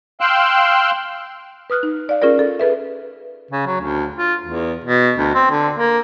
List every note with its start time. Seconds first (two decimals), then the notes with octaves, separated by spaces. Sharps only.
0.20 F5 G5 C6 E6 F#6
1.70 B4 D#6 F6 F#6
1.83 D#4
2.09 D5 F5
2.22 C#4 F4 G#4 A#4 D5
2.39 A4
2.59 G#4 A4 B4 E5
3.51 C#3
3.66 F#3
3.81 D2
4.16 F4
4.46 E2
4.84 B2
5.17 D2
5.35 C4
5.50 D3
5.75 A#3